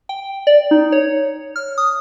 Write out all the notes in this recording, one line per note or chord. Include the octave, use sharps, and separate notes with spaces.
G5
D5
D#4
C#5
F6
D#6